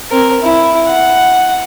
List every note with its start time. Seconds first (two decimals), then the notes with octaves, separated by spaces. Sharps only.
0.11 C4 A#4
0.42 E4
0.87 F#5